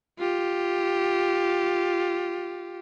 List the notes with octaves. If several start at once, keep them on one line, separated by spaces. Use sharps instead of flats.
F4 G4